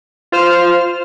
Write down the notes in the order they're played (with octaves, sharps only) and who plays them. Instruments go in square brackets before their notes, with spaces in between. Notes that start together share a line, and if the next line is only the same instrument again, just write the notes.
[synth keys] F4 C5 F6